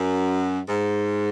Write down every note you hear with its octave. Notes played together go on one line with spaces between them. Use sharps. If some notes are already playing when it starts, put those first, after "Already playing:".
Already playing: F#2
G#2